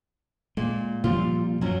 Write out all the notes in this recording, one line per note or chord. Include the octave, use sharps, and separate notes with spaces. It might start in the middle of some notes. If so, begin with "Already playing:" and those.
A#2 G#3
A#2 F3 G3 F4
F#2 F3 F#3 C#4